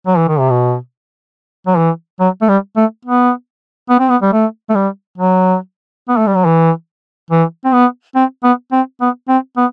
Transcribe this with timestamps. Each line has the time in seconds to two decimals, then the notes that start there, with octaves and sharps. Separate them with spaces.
0.07 F#3
0.18 E3
0.28 D#3
0.40 C3
0.50 B2
1.67 F#3
1.77 E3
2.20 F#3
2.42 A3
2.49 G3
2.77 A3
3.05 B3
3.90 B3
4.00 C4
4.09 B3
4.22 G3
4.33 A3
4.70 A3
4.75 G3
5.18 F#3
6.09 B3
6.17 A3
6.27 G3
6.36 F#3
6.45 E3
7.31 E3
7.65 C4
7.73 B3
8.16 C4
8.44 B3
8.72 C4
9.01 B3
9.29 C4
9.57 B3